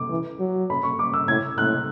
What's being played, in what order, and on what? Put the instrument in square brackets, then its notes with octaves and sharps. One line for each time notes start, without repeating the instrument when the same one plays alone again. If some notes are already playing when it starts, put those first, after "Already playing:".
Already playing: [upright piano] D6
[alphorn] E3
F#3
[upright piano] B5
C#6
D6
E6
[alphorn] A2 [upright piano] G#6
[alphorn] A2 [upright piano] F#6